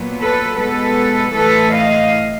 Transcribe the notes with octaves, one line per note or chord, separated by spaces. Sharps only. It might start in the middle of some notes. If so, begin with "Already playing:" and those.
Already playing: A#2 F#3 B3
A4 B4
B2 G#3 B3 A4 B4
A2 E3 A3 A4 B4
D#5 F5